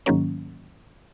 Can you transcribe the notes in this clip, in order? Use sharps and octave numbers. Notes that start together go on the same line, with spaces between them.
G#2 D#3 F#3 A#3 C#4